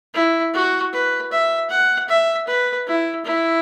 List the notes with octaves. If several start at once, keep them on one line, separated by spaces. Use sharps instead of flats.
E4
F#4
B4
E5
F#5
E5
B4
E4
E4